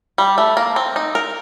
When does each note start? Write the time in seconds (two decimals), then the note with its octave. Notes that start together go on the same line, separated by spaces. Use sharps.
0.18 G3
0.38 A3
0.57 A#3
0.76 C4
0.96 D#4
1.15 A#4